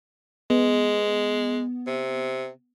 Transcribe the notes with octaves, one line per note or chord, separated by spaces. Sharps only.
G#3 B3
C3